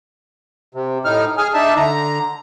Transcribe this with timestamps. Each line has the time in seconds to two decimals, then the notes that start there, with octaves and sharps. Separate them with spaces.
0.74 C3
1.05 A2 D#4 F6
1.38 G#4 G#5 F6
1.54 D4 D#4 E5 A5
1.77 D3 A#5